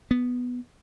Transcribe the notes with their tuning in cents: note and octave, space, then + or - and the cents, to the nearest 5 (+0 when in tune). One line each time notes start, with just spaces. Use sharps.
B3 +0